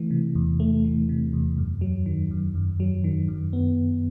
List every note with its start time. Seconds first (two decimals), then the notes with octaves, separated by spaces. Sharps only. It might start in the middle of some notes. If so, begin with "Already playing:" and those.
Already playing: E3 A3
0.11 C3
0.35 E2
0.60 A3
0.85 E3
1.09 C3
1.33 E2
1.58 F#2
1.81 F#3
2.06 D#3
2.31 F#2
2.55 F#2
2.80 F#3
3.04 D#3
3.28 F#2
3.53 B3